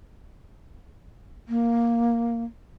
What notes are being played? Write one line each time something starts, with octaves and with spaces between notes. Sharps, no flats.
A#3